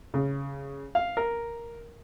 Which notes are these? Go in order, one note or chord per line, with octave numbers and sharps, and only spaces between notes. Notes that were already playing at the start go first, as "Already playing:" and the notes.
C#3
F5
A#4